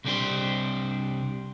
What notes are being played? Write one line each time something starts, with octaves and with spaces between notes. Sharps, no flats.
C2 C3 G3 D4 G4 C5